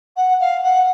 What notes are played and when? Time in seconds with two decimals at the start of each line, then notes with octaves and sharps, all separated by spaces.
0.16 F#5
0.40 F5
0.63 F#5